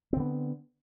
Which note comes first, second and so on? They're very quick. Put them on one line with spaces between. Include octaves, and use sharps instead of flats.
C4 D3 B3